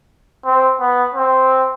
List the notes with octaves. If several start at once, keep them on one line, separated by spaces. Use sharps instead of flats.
C4
B3
C4